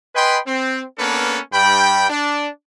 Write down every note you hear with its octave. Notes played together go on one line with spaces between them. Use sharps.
B4 D#5 G5 G#5 B5 C6
C4
A#3 B3 C#4 D4 A4 B4
G2 G5 B5
D4